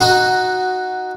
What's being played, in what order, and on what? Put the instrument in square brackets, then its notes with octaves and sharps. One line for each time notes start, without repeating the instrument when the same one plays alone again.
[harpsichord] D#4 F#4